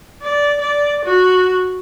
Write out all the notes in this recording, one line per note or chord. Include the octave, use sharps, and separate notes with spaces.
D5
D5
F#4